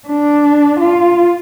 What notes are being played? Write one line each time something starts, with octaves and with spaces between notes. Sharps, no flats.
D4
F4